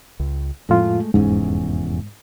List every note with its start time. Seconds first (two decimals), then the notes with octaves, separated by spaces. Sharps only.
0.20 C#2
0.69 F2 A2 G#3 A3 F4
1.14 F1 E2 G#2 C#4